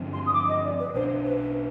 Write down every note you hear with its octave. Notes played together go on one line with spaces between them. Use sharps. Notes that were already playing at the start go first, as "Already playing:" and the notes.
Already playing: G2 D3 F3 C4
C6
D#6
D6
D#5
D5
B4
B1 B2 B3 D4 C5
B4